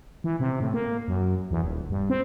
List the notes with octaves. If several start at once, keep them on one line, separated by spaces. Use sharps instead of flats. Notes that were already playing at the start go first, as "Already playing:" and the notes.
E3
C3
A2
A#3
F#2
E2
D#1
G2
C4